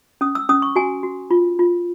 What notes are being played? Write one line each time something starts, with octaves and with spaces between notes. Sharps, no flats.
C#4 D#6
E6
C#4 D#6
C#6
F#4 G#5
F#4
F4
F4